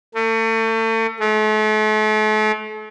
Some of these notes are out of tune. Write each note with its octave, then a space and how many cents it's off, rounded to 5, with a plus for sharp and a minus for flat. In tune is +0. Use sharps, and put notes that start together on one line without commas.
A3 +35
A3 -40